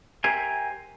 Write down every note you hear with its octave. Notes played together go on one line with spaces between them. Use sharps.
G4 A#4 C5 E5 G#5